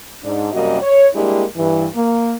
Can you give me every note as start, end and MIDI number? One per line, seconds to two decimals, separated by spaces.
0.23 0.51 44
0.23 0.51 62
0.53 0.78 42
0.53 0.78 48
0.53 0.78 55
0.53 0.78 58
0.53 0.78 66
0.53 0.78 75
0.82 1.08 73
1.15 1.44 55
1.15 1.44 56
1.15 1.44 58
1.15 1.44 62
1.15 1.44 64
1.15 1.44 67
1.57 1.87 43
1.57 1.87 52
1.94 2.34 58